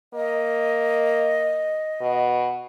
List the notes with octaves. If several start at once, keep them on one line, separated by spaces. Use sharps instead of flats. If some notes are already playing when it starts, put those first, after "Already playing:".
A#3 D#5
B2